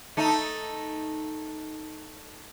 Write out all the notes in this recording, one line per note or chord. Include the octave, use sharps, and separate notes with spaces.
A3 D#4